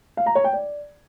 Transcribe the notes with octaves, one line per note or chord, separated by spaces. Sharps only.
F5
A#5
C#5
G5
D5